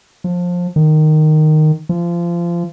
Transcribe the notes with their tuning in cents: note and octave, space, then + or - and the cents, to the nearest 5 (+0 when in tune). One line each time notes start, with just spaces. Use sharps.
F3 +20
D#3 -10
F3 -25